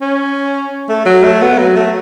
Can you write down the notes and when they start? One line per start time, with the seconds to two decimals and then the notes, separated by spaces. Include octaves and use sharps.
0.01 C#4
0.89 A3
1.06 F#3
1.23 A3
1.42 B3
1.58 F#3
1.76 A3